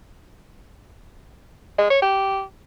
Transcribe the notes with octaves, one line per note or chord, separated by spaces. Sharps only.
G#3
C#5
G4